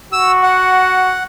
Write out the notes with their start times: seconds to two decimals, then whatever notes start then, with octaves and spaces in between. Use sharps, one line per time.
0.13 F#4 E6
0.43 F#5